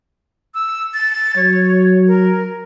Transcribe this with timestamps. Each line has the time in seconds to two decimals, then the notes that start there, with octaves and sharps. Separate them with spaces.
0.54 E6
0.94 A6
1.36 F#3 C#5
2.07 A#4